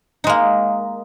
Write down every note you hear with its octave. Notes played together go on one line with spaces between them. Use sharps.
G#3 A#3 D#4